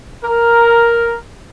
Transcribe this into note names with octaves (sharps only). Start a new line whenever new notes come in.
A#4